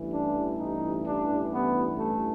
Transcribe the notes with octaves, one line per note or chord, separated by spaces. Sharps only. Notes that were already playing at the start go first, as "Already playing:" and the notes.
Already playing: A1 G2 E3
D4
D#4
D4
B3
A3